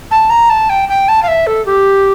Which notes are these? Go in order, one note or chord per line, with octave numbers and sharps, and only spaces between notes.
A5
A#5
A5
G5
G5
A5
F5
E5
A4
G4